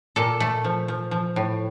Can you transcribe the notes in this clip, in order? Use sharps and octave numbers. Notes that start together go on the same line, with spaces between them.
A#2 A4
A3
F3
F3
F3
A2